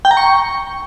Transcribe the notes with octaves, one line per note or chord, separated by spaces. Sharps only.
G5
A#5
C#6